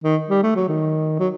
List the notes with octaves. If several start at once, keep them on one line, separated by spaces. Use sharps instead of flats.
D#3
G3
A3
F#3
D#3
F#3